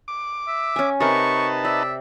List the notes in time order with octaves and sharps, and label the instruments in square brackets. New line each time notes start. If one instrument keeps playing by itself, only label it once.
[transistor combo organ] D6
[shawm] E5
[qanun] C#4 G#5
[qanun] C3 A#4 [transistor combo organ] D#4 B4 A5 [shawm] C#6
[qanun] D5 [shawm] E5